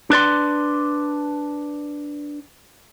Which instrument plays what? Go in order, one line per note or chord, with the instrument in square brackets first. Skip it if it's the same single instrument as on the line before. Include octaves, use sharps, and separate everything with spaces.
[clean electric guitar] D4 B4 D5 C6